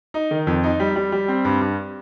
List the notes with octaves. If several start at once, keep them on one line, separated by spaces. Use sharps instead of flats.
D#4
D#3
F2
D#4
G3
G3
G3
C4
G2
G2